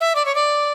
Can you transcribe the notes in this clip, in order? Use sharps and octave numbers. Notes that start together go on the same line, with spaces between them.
E5
D5
C#5
D5